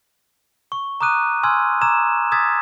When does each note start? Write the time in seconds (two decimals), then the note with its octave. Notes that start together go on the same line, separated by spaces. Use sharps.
0.72 C#6
1.01 A#5 D6 D#6 F#6 D#7
1.43 G#5 C6 E6 F6 G#6
1.81 A#5 D6 E6 G#6 E7
2.32 D#6 E6 G#6 A6 B6